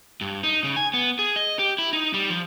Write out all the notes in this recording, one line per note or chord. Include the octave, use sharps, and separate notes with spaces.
G2
D#4
C#3
G#5
B3
G#4
D#5
G4
E4
D#4
G3
F3